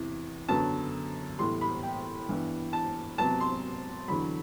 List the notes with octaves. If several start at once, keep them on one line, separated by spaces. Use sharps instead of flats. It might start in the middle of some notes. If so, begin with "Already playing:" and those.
Already playing: E2 C3 E3
F#2 D3 F#3 B3 A5
A2 E3 G3 B3 C6
B5
G5
G2 E3 B3
A5
C3 F#3 B3 A5
C6
E2 D3 F#3 B5